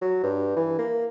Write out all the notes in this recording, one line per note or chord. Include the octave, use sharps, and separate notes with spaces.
F#3
G2
E3
A#3